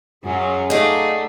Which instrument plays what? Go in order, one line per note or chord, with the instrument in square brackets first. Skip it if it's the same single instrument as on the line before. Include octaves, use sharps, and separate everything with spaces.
[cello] F#2 F#3 [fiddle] C#4 F4 [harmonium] F#4 G#4
[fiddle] A3 [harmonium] D#4 F#4 D5 [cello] G#4 [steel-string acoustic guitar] D#5 F5